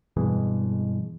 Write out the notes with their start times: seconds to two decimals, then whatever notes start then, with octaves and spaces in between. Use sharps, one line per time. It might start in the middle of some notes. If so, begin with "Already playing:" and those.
0.17 G2 B2 E3 G#3